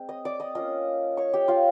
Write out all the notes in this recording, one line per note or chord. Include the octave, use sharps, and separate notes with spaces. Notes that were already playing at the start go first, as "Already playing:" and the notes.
Already playing: G#3 C4
D#5 D#6
D5 D6
D#5 D#6
A#3 C#4 F4 D#5 D#6
C#5 C#6
G4 G5
F4 F5